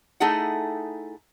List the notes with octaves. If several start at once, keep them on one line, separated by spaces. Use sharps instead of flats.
A3 D#4 E4 G#4 A4 F#5